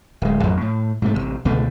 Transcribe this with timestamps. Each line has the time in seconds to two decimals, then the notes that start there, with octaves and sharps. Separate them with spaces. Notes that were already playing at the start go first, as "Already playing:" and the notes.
0.22 D1 G#3
0.43 A1 F2 F#3
0.61 A2
1.02 G#2 C3 A3
1.14 A1 A2 C3
1.45 C#2 B2 D3 A3